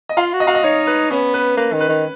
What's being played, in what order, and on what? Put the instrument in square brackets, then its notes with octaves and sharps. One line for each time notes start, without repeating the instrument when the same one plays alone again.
[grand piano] D#5
[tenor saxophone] F4 [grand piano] F5
[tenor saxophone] F#4
[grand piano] D#5
[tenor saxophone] F#4 [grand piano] F5
[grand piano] D#5
[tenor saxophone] D#4 [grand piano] C#5
[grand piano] B4
[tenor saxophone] B3 [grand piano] C#4
[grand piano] B4
[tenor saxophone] A#3 [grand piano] B4
[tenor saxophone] D#3
[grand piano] B4
[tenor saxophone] D#3